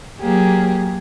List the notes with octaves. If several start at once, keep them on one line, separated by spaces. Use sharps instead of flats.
F#3 A#3 G4 G#4